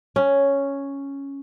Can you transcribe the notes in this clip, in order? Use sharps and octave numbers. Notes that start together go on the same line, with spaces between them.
C#4